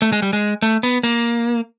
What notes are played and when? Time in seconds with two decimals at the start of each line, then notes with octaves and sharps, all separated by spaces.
0.02 A3
0.12 G#3
0.22 G3
0.33 G#3
0.62 A3
0.83 B3
1.03 A#3